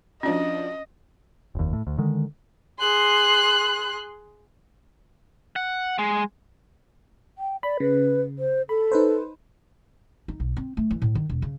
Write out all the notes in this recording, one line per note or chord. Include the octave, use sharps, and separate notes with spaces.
F3 C#4 D4 F#4 D#5
F1 D#2
A2
D2
D3 D#3 G#3
G#4 C6 F#6
F#5
G#3
G5
D5 B5
C#3 B4
C5
A4 B5
D#4 B4 C5
D#4
B1
C4
A3
E3
A2
D#3
E1
C#3